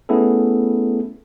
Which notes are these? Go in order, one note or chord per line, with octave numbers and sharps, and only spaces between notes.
A3 B3 C#4 E4 G#4 A4